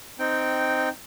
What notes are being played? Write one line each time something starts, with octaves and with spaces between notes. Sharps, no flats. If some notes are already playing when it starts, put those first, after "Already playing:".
C4 D#4 G5